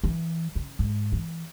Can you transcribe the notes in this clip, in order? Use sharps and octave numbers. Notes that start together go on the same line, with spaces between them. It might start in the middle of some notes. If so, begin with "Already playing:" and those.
E3
C#3
G#2
E3